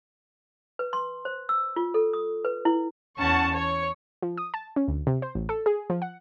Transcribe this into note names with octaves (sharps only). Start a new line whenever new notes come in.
B4
C6
C5
E6
F4
A4
D#6
B4
E4
E2 C#4 F#5 A5 C#6
C#5
F3
D#6
A5
C#4
D2
C3
C5
A1
A4
G#4
F3
F#5